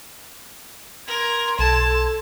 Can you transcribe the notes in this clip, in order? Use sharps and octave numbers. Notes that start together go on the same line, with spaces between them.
A#4 C6 G#6
B1 A4 A5